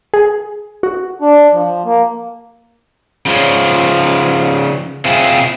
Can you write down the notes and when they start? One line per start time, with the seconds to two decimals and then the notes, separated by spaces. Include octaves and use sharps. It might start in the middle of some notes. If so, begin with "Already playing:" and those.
0.14 G#4
0.83 F#4
1.21 D4
1.53 F3
1.86 A#3
3.26 C#3 F3
5.05 C3 C4 E4 F4 G#4